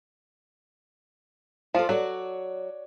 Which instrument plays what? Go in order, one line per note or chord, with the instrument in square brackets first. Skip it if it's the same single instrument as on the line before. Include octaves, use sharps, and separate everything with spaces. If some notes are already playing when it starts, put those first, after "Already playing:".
[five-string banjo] F3 F4 [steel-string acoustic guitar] A4 D5
[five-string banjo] F#3 [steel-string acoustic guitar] F#4 C#5 D5